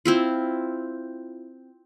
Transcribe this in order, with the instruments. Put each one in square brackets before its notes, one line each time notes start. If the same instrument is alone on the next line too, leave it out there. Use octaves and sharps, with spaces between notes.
[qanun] C4 E4 F4